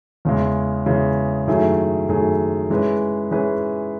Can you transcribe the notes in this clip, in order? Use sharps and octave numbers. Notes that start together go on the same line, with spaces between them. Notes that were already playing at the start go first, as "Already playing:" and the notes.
E2 C#3 E3 G#3
E2 C#3 E3 G#3
F#2 D#3 A3 E4 G#4
F#2 D#3 A3 E4 G#4
E3 G#3 C#4 G#4 B4
E3 G#3 C#4 G#4 B4